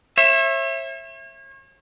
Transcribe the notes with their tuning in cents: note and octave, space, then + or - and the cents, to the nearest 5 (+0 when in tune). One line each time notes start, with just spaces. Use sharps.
C#5 -40 E5 +5